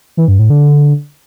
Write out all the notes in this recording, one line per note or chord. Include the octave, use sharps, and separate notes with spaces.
E3
G2
A2
D3